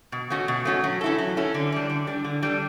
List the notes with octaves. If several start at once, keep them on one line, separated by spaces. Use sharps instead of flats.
B2
A3 C#4 F#4
B2
A3 C#4 F#4
F#3
C#4 E4 A4
F#3
C#4 E4 A4
D3
G3 D4
D3
G3 D4
D3
G3 D4 A4